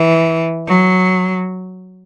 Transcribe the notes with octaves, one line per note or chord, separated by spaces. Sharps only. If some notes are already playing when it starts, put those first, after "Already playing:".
Already playing: E3
F#3